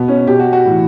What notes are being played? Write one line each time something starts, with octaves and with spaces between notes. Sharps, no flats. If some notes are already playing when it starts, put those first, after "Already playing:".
Already playing: B2 B3
C#4
B2 G4
F#4
F#4
A2 E3